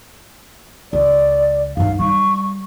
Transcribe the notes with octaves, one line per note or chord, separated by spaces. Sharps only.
C#2 D5
G2 D#4 F5
G3 C#6